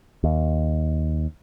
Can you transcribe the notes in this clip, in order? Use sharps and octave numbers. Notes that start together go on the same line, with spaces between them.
D#2